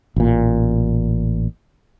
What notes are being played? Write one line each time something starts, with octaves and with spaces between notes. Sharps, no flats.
A1 A#2